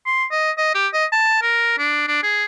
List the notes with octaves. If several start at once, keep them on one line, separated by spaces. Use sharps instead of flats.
C6
D#5
D#5
G4
D#5
A5
A#4
D4
D4
G#4